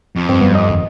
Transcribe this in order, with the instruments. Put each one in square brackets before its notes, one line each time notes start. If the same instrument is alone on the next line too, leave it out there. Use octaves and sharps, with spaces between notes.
[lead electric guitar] F2
[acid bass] G2 [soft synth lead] C4
[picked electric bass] F#3 G3 [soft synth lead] B3
[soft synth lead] D#5
[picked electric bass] E1 F#2 D#3